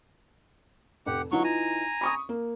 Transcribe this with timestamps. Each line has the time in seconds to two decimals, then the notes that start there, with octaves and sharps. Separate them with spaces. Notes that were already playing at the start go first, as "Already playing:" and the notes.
1.06 F1 G4 F#5
1.32 E3 F#3 D#4 F4 C#6
1.44 G#5 A#5
2.01 B5 C#6 D#6
2.29 A#3